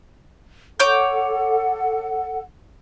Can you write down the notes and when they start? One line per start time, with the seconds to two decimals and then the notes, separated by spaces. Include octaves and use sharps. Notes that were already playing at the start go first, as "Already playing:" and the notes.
0.80 A4 C#5 F#5 D6 G6